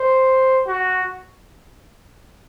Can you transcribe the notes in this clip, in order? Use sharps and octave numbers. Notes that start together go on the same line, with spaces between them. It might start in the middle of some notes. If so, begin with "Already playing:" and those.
Already playing: C5
F#4